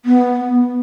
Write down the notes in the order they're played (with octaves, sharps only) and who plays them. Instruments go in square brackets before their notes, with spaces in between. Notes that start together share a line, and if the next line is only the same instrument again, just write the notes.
[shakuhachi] B3